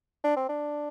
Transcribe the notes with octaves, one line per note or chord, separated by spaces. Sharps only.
D4
C4
D4